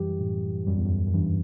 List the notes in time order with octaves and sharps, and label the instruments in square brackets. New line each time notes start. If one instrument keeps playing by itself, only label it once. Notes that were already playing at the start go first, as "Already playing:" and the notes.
Already playing: [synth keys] F#2 E3 [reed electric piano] G3 G4
[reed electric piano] A2
[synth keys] F#2 [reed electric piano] G3
[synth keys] E2
F#2
F#2
[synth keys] G2 [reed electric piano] E3